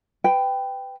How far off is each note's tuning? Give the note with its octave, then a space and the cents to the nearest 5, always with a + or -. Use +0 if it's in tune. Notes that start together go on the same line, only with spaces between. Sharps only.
B4 +20 G5 +0